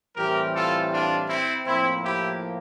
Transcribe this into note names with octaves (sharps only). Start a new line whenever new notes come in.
A2 E3 G3 C4 G4 A#4
F4 A4
D4 F4
C4 E4
A2 F3 A#3 C4 E4
E4 G4